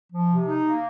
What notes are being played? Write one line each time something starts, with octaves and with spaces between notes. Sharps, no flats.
F3
C3
D#4
A#3